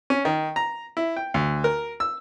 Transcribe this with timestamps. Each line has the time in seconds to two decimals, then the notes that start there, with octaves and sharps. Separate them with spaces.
0.10 C#4
0.25 D#3
0.56 A#5
0.97 E4
1.16 G5
1.34 D2
1.64 A#4
2.00 E6